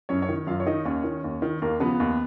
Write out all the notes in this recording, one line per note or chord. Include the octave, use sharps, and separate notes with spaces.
F#2 C#4 C#5
C#4 C#5
D#3
F#2 F4 F5
C#5
D#3 D#4 D#5
D#2 C#4 C#5
D#3
D#2
D#3
D#2 A#3 A#4
C#3 F3 B3 B4
D#2